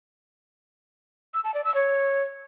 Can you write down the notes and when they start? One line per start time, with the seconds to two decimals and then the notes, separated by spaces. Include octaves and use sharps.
1.34 E6
1.44 A5
1.54 D5
1.65 E6
1.75 C#5